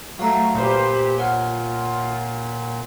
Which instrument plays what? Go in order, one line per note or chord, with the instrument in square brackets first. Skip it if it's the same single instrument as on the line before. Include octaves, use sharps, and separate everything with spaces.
[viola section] F#3 A3 [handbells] F5 A#5 C#6
[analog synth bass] A#2 [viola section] G4 B4 C5
[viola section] F4 [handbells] C#5 F#5 F6